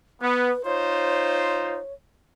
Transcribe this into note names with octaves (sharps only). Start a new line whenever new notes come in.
B3 B4
D#4 F4 C5 C#5